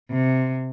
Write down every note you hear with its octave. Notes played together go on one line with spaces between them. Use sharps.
C3